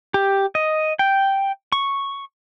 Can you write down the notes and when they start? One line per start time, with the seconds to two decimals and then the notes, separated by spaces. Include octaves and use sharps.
0.14 G4
0.55 D#5
0.99 G5
1.72 C#6